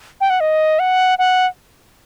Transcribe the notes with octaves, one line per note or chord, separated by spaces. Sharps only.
G5
F#5
D#5
F#5
F#5